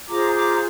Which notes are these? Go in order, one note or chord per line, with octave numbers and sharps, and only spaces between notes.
F4 G#4 C5 A#5 D6
A#5 D6